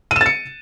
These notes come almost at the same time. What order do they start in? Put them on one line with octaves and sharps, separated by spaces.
D#7 E7 A6 C#7